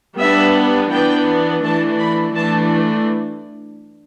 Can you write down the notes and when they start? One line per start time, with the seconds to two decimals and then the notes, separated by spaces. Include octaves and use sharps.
0.18 G3 B3 D4 E5
0.91 E3 B3 D4 G5
1.63 E3 A3 D4 A5
1.98 B5
2.35 E3 A3 D4 A5